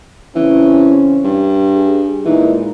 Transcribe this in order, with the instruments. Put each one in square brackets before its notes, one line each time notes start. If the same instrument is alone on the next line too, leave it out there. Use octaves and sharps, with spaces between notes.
[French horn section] C#3 C4 C#4 [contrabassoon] E3
[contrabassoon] G2
[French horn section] G#4
[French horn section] A#2 G#3 D#4 [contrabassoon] E3